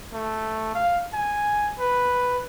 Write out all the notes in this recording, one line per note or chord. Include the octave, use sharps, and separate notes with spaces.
A3
F5
G#5
B4